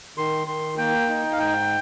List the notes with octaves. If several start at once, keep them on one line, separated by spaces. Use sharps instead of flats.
D#3 C6
D#3 C6
A#3 G5
D#4
F5
G#2 G5